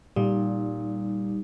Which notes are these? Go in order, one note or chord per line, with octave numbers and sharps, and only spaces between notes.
A#2 G3 D#4